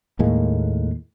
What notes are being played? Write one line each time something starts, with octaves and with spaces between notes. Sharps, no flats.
D#2 A2 G#3 A#3